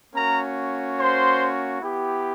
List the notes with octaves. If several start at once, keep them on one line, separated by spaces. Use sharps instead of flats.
A#3 C#4 F#4 A#4 A#5
C5 C6
B3 E4 G4